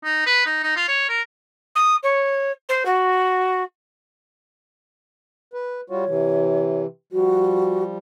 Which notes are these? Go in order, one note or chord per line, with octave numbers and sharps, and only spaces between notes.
D#4
B4
D#4
D#4
F4
C#5
A#4
D#6
C#5
C5
F#4
B4
G3 F4 F#4 C#5
C3 E3
F3 G3 F#4